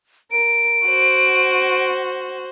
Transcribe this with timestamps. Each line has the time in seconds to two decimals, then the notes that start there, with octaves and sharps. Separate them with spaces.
0.32 A#4 D7
0.86 F#4 C5